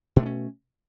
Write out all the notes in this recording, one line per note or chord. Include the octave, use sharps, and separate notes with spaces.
B2 A3 C#4 D4